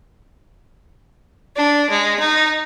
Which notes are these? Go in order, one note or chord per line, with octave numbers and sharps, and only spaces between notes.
D4
G#3
D#4